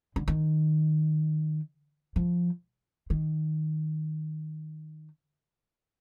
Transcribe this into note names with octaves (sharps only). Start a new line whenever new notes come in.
D3
D#3
F3
D#3